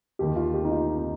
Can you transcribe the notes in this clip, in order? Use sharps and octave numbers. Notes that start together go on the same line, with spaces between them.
D#2 D#3 G4
F4
G4
D#4
F4
F4
D#4